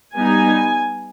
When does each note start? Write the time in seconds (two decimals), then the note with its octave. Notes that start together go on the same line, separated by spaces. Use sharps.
0.15 G3 B3 D#4 G#5